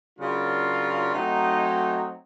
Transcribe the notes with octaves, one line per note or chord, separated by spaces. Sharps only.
C#3 F#3 A#3 D4 F4
F#3 A3 C4 D#4